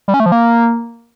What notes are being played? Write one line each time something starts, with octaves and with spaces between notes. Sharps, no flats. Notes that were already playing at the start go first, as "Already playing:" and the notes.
G3
C#4
A3
F3
A#3